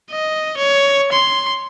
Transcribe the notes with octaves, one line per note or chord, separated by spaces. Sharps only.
D#5
C#5
C6